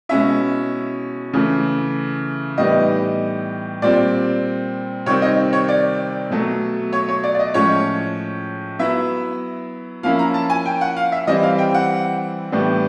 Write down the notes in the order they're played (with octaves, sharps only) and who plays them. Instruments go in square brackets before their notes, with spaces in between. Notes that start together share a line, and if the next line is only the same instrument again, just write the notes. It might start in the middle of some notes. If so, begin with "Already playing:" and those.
[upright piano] B2 G#3 C#4 E4 E5
C#3 E3 A3
A2 E3 G3 B3 D#4 D#5
A#2 G3 C4 D5
C3 D#3 G3 C4 C#5
D#5
C#5
D5
B2 F#3 A3
C#5
C#5
D5
D5
D#5
A2 F3 G#3 C#4 C#5
F#3 B3 E4 E5
F3 A#3 C#4 E4 F5
A#5
A5
G#5
G5
F#5
F5
E5
E3 G3 C4 E4 D#5
F5
G5
F#5
A2 E3 G3 B3 D4